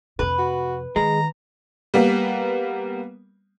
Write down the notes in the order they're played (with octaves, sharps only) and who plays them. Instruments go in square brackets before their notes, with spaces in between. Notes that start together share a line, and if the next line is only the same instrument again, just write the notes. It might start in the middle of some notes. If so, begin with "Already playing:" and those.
[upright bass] F2 C3 [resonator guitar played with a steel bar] B4
[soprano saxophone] F#4
[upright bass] D#3 [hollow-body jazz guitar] G#3 [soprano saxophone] A#5
[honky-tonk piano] G3 A#3 B3